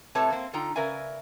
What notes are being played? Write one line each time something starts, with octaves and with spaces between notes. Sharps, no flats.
A2 C3 A3 B4 C#5 A5
A#3 C4
D3 D#4 F4 G5 A#5
C#3 A#4 B4 D5 E5 G#5